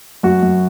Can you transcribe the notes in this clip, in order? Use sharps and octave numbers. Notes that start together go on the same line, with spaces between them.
F#2 F#4
F#2